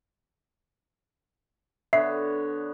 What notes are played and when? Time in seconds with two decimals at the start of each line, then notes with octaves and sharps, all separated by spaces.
1.93 D3 B3 C#5 E5 C7